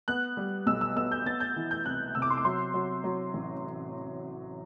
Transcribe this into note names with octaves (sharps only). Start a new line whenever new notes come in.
B3 F#6
G3
B1 E6
E6
B3 E6
G6
B3 A6
G6
E3
G6
C2 F#6
C3 E6
D6
C6
D6
F#3 C6
F#3
F#3
A1